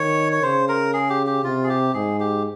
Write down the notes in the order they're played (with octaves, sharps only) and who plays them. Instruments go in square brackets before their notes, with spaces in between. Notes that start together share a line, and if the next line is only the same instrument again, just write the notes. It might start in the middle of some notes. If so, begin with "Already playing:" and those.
Already playing: [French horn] D#3 [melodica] C#5
[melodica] C#5
[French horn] C#3 [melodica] C5
[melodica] A#4
G#4
G4
G4
[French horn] C3 [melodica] F4
[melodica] G#4
G4
[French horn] G#2 [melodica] G#4
[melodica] G4